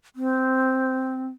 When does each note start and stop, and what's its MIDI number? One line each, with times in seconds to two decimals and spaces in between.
0.16 1.28 60